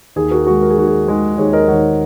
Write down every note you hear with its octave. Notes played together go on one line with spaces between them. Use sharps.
D#2 G#4
F#4 A#4
D#3 G#3 F#4
A#4
G#4
D#2 F#4
G#4
D#3 G#3
D#2 G#4 C#5
A#4 D#5
D#3 G#3 C#5 F#5